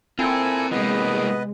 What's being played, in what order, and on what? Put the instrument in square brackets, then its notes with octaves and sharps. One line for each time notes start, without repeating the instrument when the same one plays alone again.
[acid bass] C4 [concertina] E4 A4 G#5 [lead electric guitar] F4 A#4
[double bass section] C3 G#3 [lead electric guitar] E3 A#3 [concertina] B3 B4 D#5